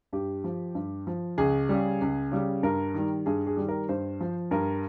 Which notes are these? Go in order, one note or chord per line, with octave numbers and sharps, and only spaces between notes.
G2 G4
F3
G2
F3
C#2 G#4
C#3 G3
C#2
C#3 G3
G2 A#4
D#3 G3
G2 G#4
G#4
D#3 G3
A#4
G2 C5
F3
G2 A#4